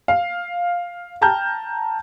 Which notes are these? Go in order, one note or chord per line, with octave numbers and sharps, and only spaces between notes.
F5
G5 A5 A#5 F6 G6